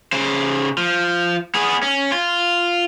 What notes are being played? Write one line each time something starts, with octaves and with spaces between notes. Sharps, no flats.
C#3 C5
F3
B3 G#4
C#4
F4